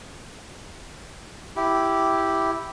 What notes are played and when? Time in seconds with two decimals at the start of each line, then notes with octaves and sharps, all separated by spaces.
1.56 E4 G4